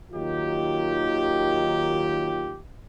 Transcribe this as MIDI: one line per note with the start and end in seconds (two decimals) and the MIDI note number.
0.12 2.56 39
0.12 2.56 51
0.12 2.56 54
0.12 2.56 63
0.12 2.56 65
0.12 2.56 67